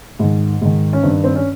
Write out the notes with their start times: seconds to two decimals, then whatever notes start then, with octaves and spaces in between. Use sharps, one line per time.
0.19 G#2 D#3
0.61 G#2 D#3
0.93 C#4
1.03 G2 D#3 C4
1.24 C4
1.36 C#4